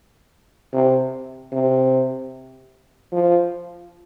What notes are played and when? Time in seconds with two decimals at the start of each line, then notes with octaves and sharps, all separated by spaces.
0.73 C3
1.52 C3
3.12 F3